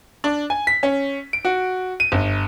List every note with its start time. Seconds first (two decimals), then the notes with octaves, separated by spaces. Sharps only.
0.24 D4
0.50 G#5
0.67 B6
0.83 C#4
1.33 D7
1.45 F#4
2.00 D#7
2.12 G1